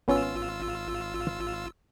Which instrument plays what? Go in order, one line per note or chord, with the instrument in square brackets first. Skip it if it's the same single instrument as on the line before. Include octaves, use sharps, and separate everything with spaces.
[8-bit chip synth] G#1 F4 E6 [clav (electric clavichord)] B3 C#4